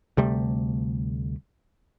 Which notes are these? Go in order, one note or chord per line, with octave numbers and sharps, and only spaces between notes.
D2 C3 G3 A3